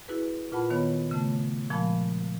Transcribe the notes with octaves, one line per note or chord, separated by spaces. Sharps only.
E4 F#4 G#4 B4
A#2 F4 B4 F#5 A5 B5
D#3 B3 C#5
C#3 A3 A5
A#2 F3 G#3 F5 A5 B5